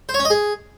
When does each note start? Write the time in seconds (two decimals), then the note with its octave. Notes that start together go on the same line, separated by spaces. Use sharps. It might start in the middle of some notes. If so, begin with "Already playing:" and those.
0.09 C5
0.14 C#5
0.20 C#4
0.25 D#5
0.30 G#4